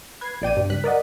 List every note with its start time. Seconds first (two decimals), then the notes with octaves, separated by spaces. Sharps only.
0.21 B4 G#6 C7
0.42 A#1 D5 G5 D#7
0.57 G2
0.70 C#2 G3 F#6 B6
0.84 A#4 D5 D#5 F#5